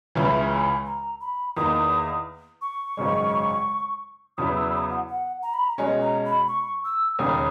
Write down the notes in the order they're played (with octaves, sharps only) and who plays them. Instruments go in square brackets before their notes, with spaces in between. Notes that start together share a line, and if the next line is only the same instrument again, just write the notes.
[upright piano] C#2 C#3 E3 [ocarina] E5
[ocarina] G#5
A#5
B5
[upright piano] E2 D#3 A#3 [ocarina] D#6
[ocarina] C#6
[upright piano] G#1 F#2 C#3 G#3
[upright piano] E2 C#3 F#3 B3 E4 [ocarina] D#6
[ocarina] E6
D#6
F#5
F#5
A#5
B5
A#5
[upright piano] B2 G#3 C#4 [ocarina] G#5
[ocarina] A#5
B5
C#6
E6
[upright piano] E1 D#2 C#3 [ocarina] D#6